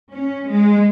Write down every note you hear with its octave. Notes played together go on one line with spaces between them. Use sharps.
C#4
G#3